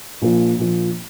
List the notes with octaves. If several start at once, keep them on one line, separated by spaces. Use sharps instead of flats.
A#1 A#2 F3
A#1 A#2 F3